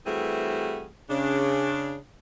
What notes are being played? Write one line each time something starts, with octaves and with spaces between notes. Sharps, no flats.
E3 G3 A3 C4 F#4 G#4
C#3 D4